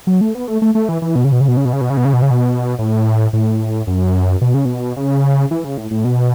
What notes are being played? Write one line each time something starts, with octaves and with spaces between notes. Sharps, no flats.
F#3
A3
B3
A3
A3
A3
E3
E3
B2
C#3
B2
C#3
B2
C#3
B2
C#3
B2
C#3
B2
C#3
B2
C#3
B2
A2
A2
F#2
B2
C#3
B2
C#3
E3
C#3
A2
A2
B2